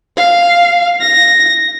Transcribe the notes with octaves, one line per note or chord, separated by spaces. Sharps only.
F5
A#6